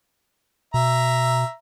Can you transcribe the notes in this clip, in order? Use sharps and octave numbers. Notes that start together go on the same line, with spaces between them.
B2 E5 A#5